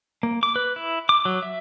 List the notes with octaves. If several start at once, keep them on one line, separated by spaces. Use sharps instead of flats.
A#3
D6
B4
E4
D6
F#3
E5